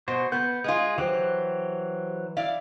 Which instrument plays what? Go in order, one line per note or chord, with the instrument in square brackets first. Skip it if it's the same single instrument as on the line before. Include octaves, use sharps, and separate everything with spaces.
[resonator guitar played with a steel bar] B2 [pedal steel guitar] F#4 C5
[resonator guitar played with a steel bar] B3 [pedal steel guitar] G6
[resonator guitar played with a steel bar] G#3 F4 [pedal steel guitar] G#4
[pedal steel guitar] E3 F#3 C5 [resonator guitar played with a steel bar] G4
[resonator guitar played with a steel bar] E4 D5 F5